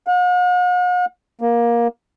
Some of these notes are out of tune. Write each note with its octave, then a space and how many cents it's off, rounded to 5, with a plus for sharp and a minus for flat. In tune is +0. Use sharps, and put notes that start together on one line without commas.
F#5 -45
A#3 +15